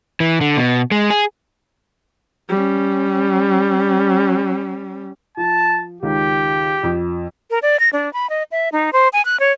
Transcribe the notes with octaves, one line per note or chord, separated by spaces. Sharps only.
E3
D3
B2
G#3
G#4
G3 C#4
F3 A5
C#2 D#3 G4
F2
A#4
D5
A#6
D4
B5
D#5
E5
D#4
C5
G#5
F#6
C#5